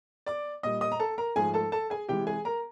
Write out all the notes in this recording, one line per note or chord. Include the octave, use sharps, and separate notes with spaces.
D5 D6
A#2 G3 D#5 D#6
D#5 D#6
A#5
A4 A5
A#4 A#5
G#2 F3 A3 G#4 G#5
A4 A5
A4 A5
G#4 G#5
C3 E3 G#3 G4 G5
G#4 G#5
A#4 A#5